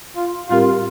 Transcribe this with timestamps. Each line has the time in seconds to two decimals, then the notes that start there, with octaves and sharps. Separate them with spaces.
0.16 F4
0.49 A2 G3 C4 F4 G4 A#4